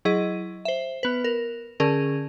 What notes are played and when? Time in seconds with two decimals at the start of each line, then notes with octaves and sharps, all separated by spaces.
0.05 F#3 E4 G#4 D#5
0.65 C5 E5
1.03 B3 B4
1.24 A#4
1.80 D3 C#4 G#4 A#4